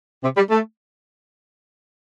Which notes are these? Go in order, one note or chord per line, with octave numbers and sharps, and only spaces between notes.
C3
G3
A3